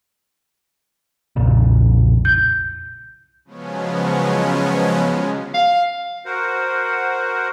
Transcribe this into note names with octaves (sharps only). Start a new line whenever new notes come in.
B1 F2 A#2 C#3
G6
C#3 F3 F#3 G#3 B3 C#4
F5
F#4 A#4 C5 F#5